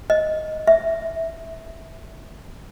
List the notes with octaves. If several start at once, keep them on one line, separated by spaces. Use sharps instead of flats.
D#5
E5